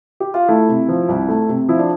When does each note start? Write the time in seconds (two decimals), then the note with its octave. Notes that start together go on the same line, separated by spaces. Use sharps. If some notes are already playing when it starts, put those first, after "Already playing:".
0.20 G4
0.34 F4
0.48 A3 E4
0.68 C3
0.89 F3
1.09 C2
1.28 A3
1.49 C3
1.68 F3 E4
1.79 D4